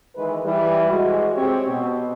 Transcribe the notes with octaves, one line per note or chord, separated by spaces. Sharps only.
D#3 E3 G#3 B4
E3 G3
G#3 F#4
C4 G4 C#5
B2